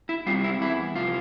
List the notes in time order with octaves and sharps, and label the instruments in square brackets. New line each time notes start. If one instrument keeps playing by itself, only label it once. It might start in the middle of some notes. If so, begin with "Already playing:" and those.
[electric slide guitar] E4
G3 C4 F4
E4
E2 E4
C3 F3 F4